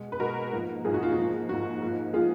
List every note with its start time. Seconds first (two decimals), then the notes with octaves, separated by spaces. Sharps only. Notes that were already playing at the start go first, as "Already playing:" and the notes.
Already playing: B2 G#3
0.12 B4
0.20 B2 G#3 F#4 A#4
0.52 G#2 F3 A#3
0.85 G#2 F3 A#3 G#4
0.94 F#4
1.03 F4
1.12 F#4
1.18 G#2 F3 A#3
1.49 G#2 F3 A#3 F#4
1.82 G#2 F3 A#3
2.14 F3 A#3 F4 G#4